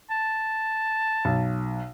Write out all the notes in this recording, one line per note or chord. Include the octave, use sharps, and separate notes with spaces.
A5
B1